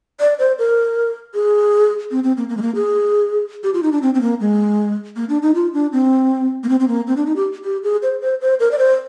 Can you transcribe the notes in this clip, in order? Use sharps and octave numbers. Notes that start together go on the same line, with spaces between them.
D5
C5
A#4
G#4
C4
C4
A#3
A#3
G#3
A#3
G#4
G4
F4
D#4
D4
C4
C4
A#3
G#3
A#3
D4
D#4
F4
D4
C4
A#3
C4
C4
A#3
C4
D4
D#4
G4
G4
G#4
C5
C5
C5
A#4
D5
C5